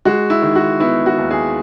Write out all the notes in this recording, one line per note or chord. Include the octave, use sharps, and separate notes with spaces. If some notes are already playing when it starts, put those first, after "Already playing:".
G#3 F#4
E4
D#3
F#4
B3 E4
F#4
D#2
G#4